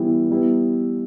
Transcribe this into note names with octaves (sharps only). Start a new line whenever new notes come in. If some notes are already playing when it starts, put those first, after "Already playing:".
Already playing: E3 G3 B3 E4
G3 B3 E4